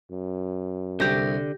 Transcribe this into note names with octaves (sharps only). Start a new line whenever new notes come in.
F#2
C2 D3 G4 A#6